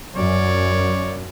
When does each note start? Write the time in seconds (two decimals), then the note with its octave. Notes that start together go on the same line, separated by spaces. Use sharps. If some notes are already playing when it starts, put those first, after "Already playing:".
0.16 F#2 C#5 D5